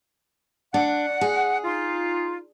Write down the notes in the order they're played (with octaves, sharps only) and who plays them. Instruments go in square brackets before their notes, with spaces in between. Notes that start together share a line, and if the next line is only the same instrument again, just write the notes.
[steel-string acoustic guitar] D4 [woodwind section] F#5
[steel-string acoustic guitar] G#4
[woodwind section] D#4 F4